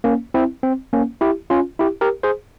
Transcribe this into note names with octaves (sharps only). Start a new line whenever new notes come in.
A#3 C#4
C4 E4
C4
A#3 C#4
E4 G4
C#4 F4
E4 G4
G4 A#4
G#4 C5